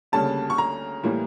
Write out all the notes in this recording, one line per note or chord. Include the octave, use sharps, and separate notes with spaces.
D2 C#3 G3 A#3 C#4 A5
C#6
A#5
A2 E3 G3 A#3